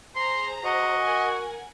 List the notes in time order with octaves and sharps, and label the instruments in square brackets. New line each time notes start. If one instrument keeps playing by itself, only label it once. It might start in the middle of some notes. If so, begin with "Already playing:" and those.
[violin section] G#4 C5 A#5 [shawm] C6
[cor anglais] F#4 [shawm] D#5
[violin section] A#4 F#5 G#5